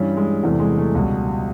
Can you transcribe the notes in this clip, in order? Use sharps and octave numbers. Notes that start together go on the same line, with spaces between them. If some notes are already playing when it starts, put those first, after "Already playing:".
Already playing: G2 E3 G3 C#4
G#3
E2 C3 E3 G3 A3
G#3
A3
C#2 B2 G3